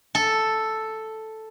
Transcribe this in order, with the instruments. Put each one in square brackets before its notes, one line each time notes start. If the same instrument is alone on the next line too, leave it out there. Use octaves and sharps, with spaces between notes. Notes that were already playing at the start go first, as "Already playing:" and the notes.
[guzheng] A4